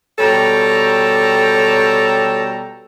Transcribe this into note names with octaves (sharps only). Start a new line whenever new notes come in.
B2 G3 A4 C#5 G5 A#5